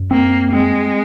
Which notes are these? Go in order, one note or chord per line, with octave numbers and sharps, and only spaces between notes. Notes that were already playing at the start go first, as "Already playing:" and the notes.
Already playing: F#2
A#3 C4
G#3 C4